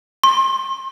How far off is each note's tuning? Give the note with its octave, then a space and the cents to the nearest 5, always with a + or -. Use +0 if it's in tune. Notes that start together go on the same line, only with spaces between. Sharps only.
C6 +40